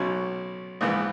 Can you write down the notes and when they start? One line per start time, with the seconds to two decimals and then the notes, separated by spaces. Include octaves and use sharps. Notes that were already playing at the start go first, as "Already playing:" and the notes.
Already playing: B1 B2 F#3 C#4
0.81 A#1 G#2 E3 B3